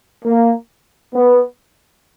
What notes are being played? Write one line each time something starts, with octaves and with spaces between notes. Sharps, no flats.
A#3
B3